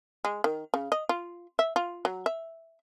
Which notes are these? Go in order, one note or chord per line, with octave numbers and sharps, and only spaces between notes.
G#3
D#3
C#3
D#5
F4
E5
F4
F#3
E5